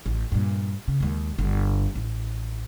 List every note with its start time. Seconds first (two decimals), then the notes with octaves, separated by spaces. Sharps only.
0.06 A1
0.32 G2 A#2
0.88 C#3
1.00 D#2 G#3
1.38 G1 D3
1.95 A1